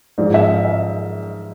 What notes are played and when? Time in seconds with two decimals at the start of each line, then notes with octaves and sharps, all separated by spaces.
0.18 G#2 F3 D5
0.34 E5
0.49 F5
0.65 E5